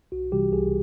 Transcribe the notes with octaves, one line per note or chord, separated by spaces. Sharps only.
C2 F#4
C3 E3 G3 G4
C2 G#4